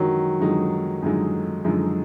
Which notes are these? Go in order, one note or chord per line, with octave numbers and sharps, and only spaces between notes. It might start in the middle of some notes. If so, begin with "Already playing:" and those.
Already playing: F#2 D3 D#3 F3 F#3 G#3 D#4
F#2 D3 F3 G#3 D#4
F#2 D3 F3 G#3 D#4
F#2 D3 F3 G#3 D#4